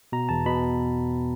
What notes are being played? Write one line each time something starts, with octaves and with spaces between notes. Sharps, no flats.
B2 A#5
E2 A5
B2 B5